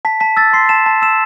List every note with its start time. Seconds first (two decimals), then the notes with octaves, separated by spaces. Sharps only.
0.05 A5 B6
0.20 A5 B6
0.37 E6 A6
0.53 C6 C7
0.69 A5 E7
0.86 A5
1.02 E6 E7